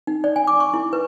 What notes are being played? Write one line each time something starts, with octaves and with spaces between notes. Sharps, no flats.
D#4
D5
G#5
D6
C#6
E4
B4